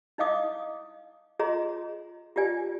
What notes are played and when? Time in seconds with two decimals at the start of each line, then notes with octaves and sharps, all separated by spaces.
0.18 D#4 E4 D#5 F5 D6 D#6
1.39 F4 G#4 C#5 D#5 A#5 C6
2.36 F4 G4 D5 G#5